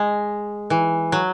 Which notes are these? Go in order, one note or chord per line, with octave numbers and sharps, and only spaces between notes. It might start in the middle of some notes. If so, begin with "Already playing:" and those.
Already playing: G#3
E3
F#3